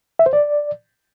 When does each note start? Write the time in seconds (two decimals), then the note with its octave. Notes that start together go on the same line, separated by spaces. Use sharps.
0.19 E5
0.26 C5
0.33 D5